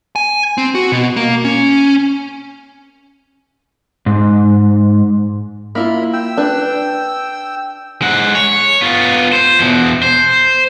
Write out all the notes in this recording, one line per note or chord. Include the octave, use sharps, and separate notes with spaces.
G#5
C4
F#4
B2
A#3
C#4
G#2
A#3 E4 F4 B5
G5 E6
D4 B4
G#3 F#5
C#5
B3 F4
C5
E2 B2
C5